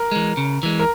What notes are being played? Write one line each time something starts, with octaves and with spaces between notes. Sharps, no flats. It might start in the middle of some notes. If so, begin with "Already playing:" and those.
Already playing: A#4
E3 G#3
C#3
E3 G#3
A#4